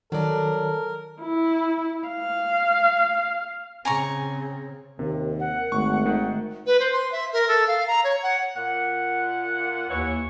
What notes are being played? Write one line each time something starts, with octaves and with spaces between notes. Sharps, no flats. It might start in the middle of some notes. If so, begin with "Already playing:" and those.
D#3 F#3 A4 A#4 D5
E4
F5
C#3 C4 G#5 A#5 C#6
D#2 C3 A#4
F#5
G#1 A3 C#6
D#3
B4
C5
C6
E5
A#4
A4
F5
A#5
C#5
F#5
A#2 F#5
D#2 E3 C#5